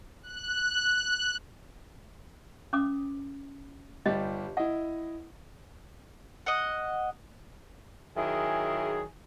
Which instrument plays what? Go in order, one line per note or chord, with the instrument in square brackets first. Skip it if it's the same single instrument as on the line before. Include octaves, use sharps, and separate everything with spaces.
[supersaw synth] F#6
[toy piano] C#4 D6 D#6
[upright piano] G1 G3 G4 [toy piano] D#5
[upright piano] E4 D#5 [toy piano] F#5
[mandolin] D#5 F#5
[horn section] D#3 F#3 E4 G#4